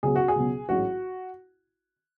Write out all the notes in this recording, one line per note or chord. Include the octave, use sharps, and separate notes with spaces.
C#2 B2 F#3 G#4
F#4
G#4
C#2 B2 F#3
A1 G#2 F#3 F#4